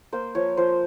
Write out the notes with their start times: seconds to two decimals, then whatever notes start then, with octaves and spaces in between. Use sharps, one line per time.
0.13 A#3 C5
0.35 F3 C#5
0.57 F3 C5